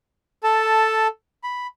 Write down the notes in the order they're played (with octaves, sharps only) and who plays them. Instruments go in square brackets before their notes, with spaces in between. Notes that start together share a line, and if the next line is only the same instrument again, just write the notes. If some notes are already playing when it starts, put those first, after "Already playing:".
[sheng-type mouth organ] A4 A5
B5